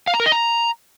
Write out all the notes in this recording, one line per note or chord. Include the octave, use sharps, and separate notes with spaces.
F5
A#5
A#4
D#5
A#5